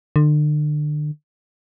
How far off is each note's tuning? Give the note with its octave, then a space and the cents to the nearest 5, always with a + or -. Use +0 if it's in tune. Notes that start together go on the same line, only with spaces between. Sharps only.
D3 +35